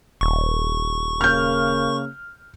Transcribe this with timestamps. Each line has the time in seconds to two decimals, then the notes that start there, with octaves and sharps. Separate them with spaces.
0.21 D#1 C#6
1.21 C#3 A#3 F6 G6